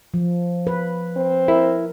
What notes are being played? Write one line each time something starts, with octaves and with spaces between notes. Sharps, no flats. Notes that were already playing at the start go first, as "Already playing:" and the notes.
F3
B4
C4
E4 A#4